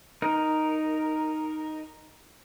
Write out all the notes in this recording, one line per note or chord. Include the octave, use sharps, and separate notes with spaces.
D#4 A#4